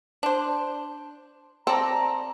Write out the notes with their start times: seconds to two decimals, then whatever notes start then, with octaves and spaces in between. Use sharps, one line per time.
0.23 D4 C5
1.67 C4 A4 D5 A#5